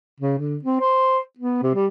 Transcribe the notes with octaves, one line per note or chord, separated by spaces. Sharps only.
C#3
D3
C4
C5
B3
C3
G3